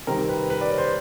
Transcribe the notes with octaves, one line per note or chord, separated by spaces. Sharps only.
C3 D#3 G3 C4 A#4
B4
B4
D5
C#5
C5